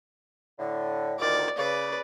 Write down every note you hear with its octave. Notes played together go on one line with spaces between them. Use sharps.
A2 D3
D2 A#2 D#3 D5
C#3 B4 D5